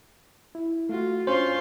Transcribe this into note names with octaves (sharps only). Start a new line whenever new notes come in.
E4
A3 F4 F#4
C#4 D4 F4 C5 C6